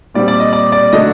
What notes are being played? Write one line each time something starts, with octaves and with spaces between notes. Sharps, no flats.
A#2 G3 C4 D5
D5
D#5
D5
D5
D3 F#3 A3 D#5